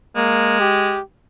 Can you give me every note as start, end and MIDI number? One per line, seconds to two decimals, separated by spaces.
0.16 0.97 56
0.16 0.58 58
0.60 1.02 67